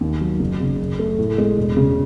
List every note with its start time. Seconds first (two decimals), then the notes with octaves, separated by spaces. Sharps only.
0.01 D#2
0.21 F#3
0.40 F#1
0.60 C#3
0.79 F#2
0.99 A3
1.19 A2
1.38 G#3
1.57 E1
1.77 C#3